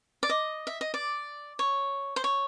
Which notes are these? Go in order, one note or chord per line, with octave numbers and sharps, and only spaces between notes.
D5
D#5
E5
D#5
D5
C#5
C5
C#5